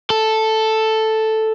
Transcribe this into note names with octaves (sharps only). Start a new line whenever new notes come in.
A4